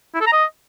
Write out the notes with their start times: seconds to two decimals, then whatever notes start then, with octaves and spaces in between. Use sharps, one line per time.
0.15 E4
0.21 A4
0.26 A#5
0.32 D#5